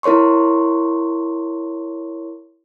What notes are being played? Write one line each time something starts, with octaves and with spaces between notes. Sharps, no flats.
E4 A#4 C#5 C6 C#6